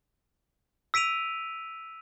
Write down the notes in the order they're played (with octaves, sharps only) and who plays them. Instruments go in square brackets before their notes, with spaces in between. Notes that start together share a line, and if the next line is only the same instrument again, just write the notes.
[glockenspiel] E6 B6 D7 D#7 F7